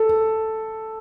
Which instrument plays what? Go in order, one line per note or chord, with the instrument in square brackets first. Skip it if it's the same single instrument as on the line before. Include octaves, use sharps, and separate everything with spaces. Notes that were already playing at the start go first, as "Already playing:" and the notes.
Already playing: [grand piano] A4